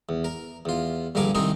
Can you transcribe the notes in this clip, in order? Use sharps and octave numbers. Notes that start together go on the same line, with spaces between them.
E2
A#4
E2 F4
A#1 G2 D3 A#4 G#5 D6
C2 D#3 C4 D#4 A#4 G#5